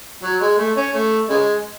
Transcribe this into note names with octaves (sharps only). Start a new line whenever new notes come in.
F#3
G#3
A3
C#4
A3
C#3 G#3